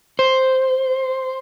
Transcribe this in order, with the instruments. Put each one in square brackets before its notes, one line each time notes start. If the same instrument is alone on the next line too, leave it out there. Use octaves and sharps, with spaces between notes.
[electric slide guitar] C5